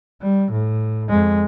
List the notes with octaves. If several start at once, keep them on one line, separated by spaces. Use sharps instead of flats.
G3
A2
F2 G#3